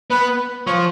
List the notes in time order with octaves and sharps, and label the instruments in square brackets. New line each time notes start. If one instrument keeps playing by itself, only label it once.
[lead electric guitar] B3 [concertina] B4 B5
[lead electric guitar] F3 [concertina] C#5 C#6